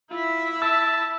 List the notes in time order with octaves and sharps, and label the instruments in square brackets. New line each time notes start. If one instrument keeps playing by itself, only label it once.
[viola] E4 E5 [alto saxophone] F4
[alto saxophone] A5 [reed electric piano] E6